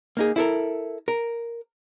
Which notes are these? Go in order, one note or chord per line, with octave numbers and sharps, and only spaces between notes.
A#3 D#4 G#4
E4 A4 A#4
A#4